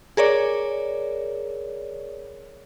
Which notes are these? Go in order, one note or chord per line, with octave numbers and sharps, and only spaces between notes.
G#4 A#4 C#5 D5